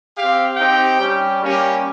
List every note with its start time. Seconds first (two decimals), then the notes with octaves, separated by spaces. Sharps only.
0.16 C4 G4 F5
0.57 C4 D#4 G4 G5
0.98 G3 C#4 G4
1.40 G3 A#3 C#4 G4